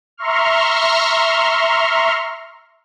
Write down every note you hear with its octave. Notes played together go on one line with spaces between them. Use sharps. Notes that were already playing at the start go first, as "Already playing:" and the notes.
E5 A#5 C6 C#6 F6